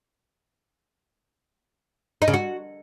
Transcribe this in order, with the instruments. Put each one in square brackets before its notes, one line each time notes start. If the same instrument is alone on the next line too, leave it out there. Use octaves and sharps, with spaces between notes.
[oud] D#4
C#3
F#4